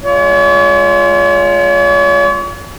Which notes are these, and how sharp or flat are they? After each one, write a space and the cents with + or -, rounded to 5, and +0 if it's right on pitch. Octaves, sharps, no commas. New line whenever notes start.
G#3 +0 F4 +0 C#5 +45